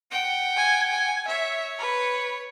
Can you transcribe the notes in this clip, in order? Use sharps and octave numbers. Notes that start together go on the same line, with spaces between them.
F#5 G5
G#5
G#5
C#5 E5
B4